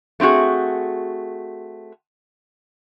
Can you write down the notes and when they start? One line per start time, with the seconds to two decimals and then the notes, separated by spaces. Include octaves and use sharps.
0.20 A3 C4 D#4 F#4 G#4